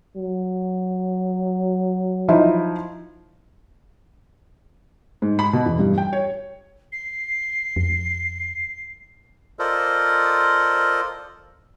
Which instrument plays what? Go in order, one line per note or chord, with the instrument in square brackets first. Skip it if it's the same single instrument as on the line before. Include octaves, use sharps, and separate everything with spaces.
[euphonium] F#3
[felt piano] F3 D#4 E4
G#2
B5
B2
E2
G2
G5
C#5
[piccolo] C7
[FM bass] F2
[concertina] F4 A4 A#4 C5 D5 D#5